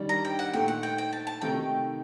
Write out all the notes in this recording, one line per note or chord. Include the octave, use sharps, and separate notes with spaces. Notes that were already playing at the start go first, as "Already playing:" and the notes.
Already playing: D#3 G3 D4
A#5
G5
F#5
A#2 A3 D#4 G5
F#5
G5
G5
A5
A5
C3 D#3 A3 D#4 G5